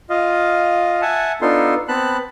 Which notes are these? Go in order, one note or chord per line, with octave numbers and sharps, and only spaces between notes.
F4 D#5 F5
E5 F#5 G#5 A5
B3 D4 D#4 F4 A4 C6
B3 C4 A5 B5 F#6